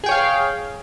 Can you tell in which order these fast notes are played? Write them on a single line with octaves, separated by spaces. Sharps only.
G#4 G5 C#5 F5